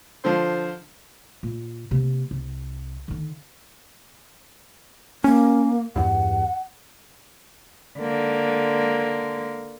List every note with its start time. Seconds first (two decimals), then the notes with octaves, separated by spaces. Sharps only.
0.25 D3 F3 F4 C5
1.43 A#2
1.91 C3 A#3
2.31 C2
3.08 D3 D#3
5.24 A#3 C#4
5.96 E2 G2 F#5
7.99 D3 A#3